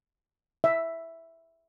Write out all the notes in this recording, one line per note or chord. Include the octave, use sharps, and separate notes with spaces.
E5